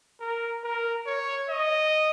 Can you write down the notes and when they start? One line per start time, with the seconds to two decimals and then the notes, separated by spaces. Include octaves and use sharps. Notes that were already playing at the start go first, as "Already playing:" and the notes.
0.20 A#4
0.64 A#4
1.06 C#5
1.49 D#5